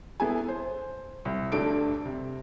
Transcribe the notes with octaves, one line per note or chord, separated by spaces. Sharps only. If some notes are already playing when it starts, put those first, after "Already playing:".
B3 E4 G#4 A4 G#5
C5
C2
D2 G2 D4 A4 D7
C3